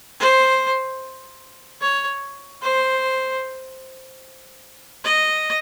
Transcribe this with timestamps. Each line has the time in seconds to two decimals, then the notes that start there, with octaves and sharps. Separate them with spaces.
0.20 C5
1.82 C#5
2.62 C5
5.04 D#5